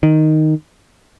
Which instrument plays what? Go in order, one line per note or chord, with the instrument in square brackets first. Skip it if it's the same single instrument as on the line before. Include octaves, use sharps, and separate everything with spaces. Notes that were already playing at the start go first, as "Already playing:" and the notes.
[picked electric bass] D#3